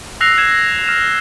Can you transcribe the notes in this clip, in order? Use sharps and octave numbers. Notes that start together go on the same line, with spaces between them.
E6 F#6 A#6 C7 F7
E6 G#6 E7
F6 E7